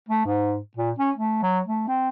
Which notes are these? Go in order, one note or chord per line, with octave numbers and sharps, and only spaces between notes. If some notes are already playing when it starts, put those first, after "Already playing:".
A3
G#2
A#2
C#4
A3
F#3
A3
C4